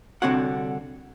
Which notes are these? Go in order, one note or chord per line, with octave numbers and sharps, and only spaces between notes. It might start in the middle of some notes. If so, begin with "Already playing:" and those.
C2 D3 C4 F#4 C#5 F#5